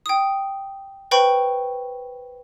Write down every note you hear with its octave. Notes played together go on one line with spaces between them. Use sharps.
G5 D#6
B4 C5 G5 B5 C#6